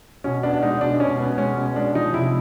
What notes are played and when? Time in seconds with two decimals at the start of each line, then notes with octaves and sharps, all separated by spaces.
0.24 B2 C#4
0.43 B3 D4
0.54 D4
0.62 G#3 D#4
0.81 B2 D4
1.00 B2 C#4
1.20 B3
1.38 G#3 C#4
1.57 B2
1.76 G#3 D4
1.95 F3 D#4
2.14 C3 E4